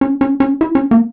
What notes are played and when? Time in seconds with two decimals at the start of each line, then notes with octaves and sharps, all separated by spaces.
0.01 C#4
0.21 C#4
0.40 C#4
0.61 E4
0.75 C#4
0.91 A#3